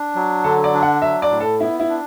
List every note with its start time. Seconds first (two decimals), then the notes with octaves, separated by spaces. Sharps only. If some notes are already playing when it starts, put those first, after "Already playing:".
Already playing: D4
0.15 F#3
0.44 D3 A4
0.64 D5
0.74 D4
0.82 F#5
1.02 F#3 E5
1.22 D5
1.31 A2
1.40 A4
1.60 B3 E4
1.80 E4
1.90 D4